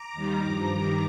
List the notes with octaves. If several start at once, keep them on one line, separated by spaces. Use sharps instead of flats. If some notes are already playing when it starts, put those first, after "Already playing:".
Already playing: A#5 D6
D#2 D#3 G3
G2 F3
G2 D#3 G3 A#5 D6